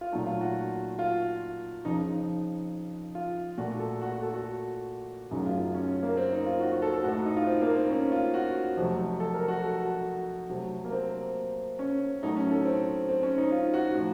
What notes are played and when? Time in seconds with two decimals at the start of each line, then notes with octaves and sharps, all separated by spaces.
0.01 F4
0.12 A#2 F#3 A3 D#4
0.26 F4
0.41 F#4
0.99 F4
1.85 F2 C#3 F3 D#4
3.15 F4
3.58 A#2 A3 F#4
3.80 A4
4.02 F#4
4.12 F#4
4.22 A4
4.34 F#4
5.31 F#2 C#3 F#3 A3 D#4
5.46 F4
5.75 C#4
6.03 A#3
6.17 C4
6.32 D#4
6.46 F4
6.61 F#4
6.72 F#4
6.82 A4
6.93 A4
7.03 A2 A3 F#4
7.14 D#4
7.26 D#4
7.37 F4
7.47 C4
7.62 A#3
7.75 C4
7.90 C#4
8.12 F4
8.34 F#4
8.77 F2 C3 F#3 A3
9.20 A4
9.34 A#4
9.48 F#4
9.64 A4
9.85 F#4
10.49 C3 F#3 A3
10.85 A#3
10.92 C4
11.79 C#4
12.22 A2 F#3 A3 D#4
12.37 C#4
12.52 A4
12.65 C4
13.09 C4
13.23 C#4
13.38 D#4
13.52 F4
13.74 F#4
13.95 A2 F3